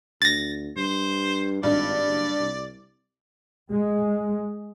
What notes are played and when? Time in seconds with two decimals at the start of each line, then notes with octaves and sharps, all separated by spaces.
0.22 D2 A6 A#6
0.77 G2 C5
1.63 G#1 G2 D5
2.07 F#1
2.38 C2
3.71 G#3